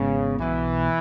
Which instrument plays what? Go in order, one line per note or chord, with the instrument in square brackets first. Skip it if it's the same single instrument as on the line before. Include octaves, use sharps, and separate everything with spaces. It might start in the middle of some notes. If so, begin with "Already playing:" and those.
Already playing: [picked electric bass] G#1 G#2 G#3 B3 [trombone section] C#3
[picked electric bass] B1 B2 B3 [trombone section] E3